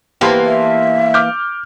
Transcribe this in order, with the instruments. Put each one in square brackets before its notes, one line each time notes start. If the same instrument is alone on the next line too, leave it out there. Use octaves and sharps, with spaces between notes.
[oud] E3 A#3 B3 [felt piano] G4 A5 C6
[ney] E5
[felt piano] D6 F6 G6